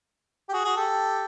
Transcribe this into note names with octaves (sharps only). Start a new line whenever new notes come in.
G4
F#4 G#4
F#4 G#4
G4 A4